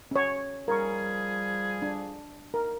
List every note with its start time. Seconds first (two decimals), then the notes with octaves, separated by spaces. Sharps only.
0.11 C#4 C#5
0.68 F3 G3 G#4 A#4 C#6
1.82 D4
2.54 A#4